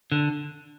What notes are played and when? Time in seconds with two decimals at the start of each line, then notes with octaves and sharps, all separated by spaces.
0.12 D3